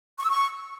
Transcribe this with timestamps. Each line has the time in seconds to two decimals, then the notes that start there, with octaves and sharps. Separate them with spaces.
0.18 C#6
0.24 E6
0.30 C#6